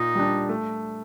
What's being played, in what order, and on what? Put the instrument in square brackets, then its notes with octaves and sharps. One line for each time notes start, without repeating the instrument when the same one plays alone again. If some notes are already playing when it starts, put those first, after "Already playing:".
Already playing: [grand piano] A#2 [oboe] D#4
[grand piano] G3 D4
A3